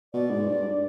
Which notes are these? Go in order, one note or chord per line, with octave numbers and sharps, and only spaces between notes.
B2 D5
G#2
G2